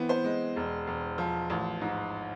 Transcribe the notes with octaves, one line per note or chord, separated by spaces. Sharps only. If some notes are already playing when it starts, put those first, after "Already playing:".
Already playing: E3 B3 C4
C5
G#3
E1
E1
F3
A1
G#2